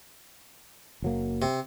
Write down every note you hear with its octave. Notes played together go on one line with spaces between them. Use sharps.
F#1 F#3 A#3
C3